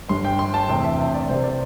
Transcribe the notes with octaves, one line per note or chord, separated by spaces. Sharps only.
G1 G2 G3 C6
G5
C6
A5
E2 C3 A3 C4 G5
E5
E5
D5
C2 C3 G3 C5
D5